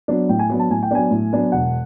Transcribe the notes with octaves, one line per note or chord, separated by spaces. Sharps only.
F#3 B3 D4
A2 G5
G#5
F#3 B3 D4
A5
A2 G#5
G5
F#3 B3 D4 G#5
A2
F#3 B3 D4
E1 F#5